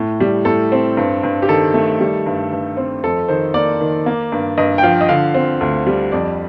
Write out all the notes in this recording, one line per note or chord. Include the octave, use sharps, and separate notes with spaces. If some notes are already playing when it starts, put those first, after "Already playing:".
Already playing: A2
G3
A2 A4
C4
G2
G2
G4
D#3 A4
A3
G3
G2
G2
C4
F2 A4
D#3 C5
A#3 D5
D#3
A#3
G2
G2 D#5
G5
F3 F5
D#5
D3 F5
C4
D2
G3
F2 D5